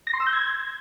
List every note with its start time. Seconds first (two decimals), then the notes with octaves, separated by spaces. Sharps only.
0.07 A#6
0.13 C6
0.20 E6
0.27 G6
0.33 G#6